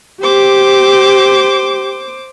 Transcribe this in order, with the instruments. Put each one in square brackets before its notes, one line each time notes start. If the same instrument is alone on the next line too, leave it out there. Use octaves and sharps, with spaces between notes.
[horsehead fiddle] G4 [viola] C5 D6